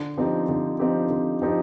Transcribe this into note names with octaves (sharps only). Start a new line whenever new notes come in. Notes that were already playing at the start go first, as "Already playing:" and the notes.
Already playing: D3
F3 C4 D#4 G4
D3
F3 C4 D#4 G4
D3
F3 C4 D#4 G4